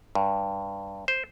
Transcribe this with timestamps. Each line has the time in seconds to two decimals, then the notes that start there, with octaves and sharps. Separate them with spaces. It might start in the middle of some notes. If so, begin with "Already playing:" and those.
0.15 G2
1.08 C5